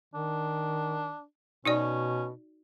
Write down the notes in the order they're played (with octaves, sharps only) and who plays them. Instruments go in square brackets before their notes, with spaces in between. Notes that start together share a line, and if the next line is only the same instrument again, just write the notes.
[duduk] D#3 [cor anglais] D4
[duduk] B2 [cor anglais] C#4 [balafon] D#4 F#4 D5